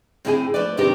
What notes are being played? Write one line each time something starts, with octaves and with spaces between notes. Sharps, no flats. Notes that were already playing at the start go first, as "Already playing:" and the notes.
A2 D3 C4 E4 G#4 G#5
F3 A3 B4 D5
F#2 C3 D#3 D4 G4 A#4